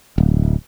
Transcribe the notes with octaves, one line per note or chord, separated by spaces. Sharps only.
D1